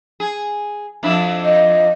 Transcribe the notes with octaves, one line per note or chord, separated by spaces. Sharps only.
G#4
F2 D4 E4
D#5